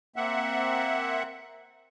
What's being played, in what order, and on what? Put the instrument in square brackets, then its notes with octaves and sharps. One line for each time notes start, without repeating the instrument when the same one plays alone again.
[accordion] A#3 C4 E5 F#5